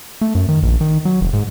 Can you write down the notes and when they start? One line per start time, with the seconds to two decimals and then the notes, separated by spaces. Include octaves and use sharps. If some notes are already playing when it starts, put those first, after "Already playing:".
0.21 A3
0.35 F#2
0.49 D#3
0.63 A#1
0.81 D#3
1.05 F#3
1.21 F1
1.33 G#2